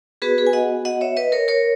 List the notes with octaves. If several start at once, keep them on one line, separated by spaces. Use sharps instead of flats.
B3 F#4 G#4 B4
G#4 B4
G#5
D#5 F#5
D#5 F#5
C#5 E5
B4 D#5
A#4 C#5
A#4 C#5